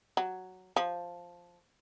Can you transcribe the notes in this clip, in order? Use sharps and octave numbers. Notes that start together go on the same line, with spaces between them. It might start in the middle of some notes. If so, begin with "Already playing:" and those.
F#3
F3